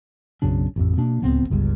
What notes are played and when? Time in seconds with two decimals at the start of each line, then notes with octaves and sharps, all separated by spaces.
0.42 B1 F#2 C#3 D4
0.76 A1 F2
0.97 B2 A#3 D4
1.22 D1 C#2 B3 C4
1.50 G1 C#2 G2